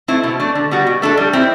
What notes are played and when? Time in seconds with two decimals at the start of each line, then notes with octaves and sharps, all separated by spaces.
0.08 A3 C4 E4
0.23 B2
0.40 A3 D4
0.55 D3
0.71 G3 B3 F#4
0.87 B2
1.02 A3 D4 A4
1.17 G3
1.33 C4 E4